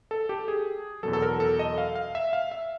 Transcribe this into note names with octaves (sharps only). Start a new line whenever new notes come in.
A4
G4
G#4
E2 B2 F#3 A4
A4
A#4
A4
D#5
F5
F5
E5
F5
E5